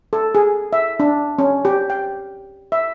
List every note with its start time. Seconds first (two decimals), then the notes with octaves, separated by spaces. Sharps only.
0.13 A4
0.35 G#4
0.73 E5
1.00 D4
1.38 C#4
1.65 G4
1.90 G5
2.72 E5